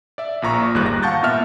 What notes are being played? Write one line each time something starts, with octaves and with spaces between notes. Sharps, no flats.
D5 E5
A#1 A#2 A#5 C#6
G1 D#2 G#2 G3 F#6
A#6
F5 F#5 A5 C#6 G6 A6
A#2 B3 E5 F6